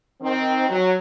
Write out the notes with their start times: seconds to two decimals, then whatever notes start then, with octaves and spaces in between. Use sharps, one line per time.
0.21 D#3 C4
0.69 F#3